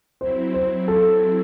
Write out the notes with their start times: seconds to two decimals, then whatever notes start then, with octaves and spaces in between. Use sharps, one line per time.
0.20 F#3 C4 E4 C5
0.54 C5
0.88 A4